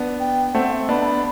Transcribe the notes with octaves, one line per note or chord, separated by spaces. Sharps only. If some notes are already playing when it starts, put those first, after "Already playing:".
Already playing: B3 D4
G5
A3 C4 F#5
E5
B3 D4 B5
A5
B5